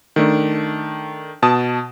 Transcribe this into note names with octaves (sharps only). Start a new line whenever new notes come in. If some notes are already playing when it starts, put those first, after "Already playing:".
D#3 A3 D4
B2 A5 D#6